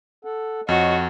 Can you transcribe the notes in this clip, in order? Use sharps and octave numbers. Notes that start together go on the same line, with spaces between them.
A4 F#5
F2 F#4 C#5 D#5